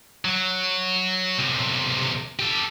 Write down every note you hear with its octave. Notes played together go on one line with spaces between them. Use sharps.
F#3
B1 C3
G4 A4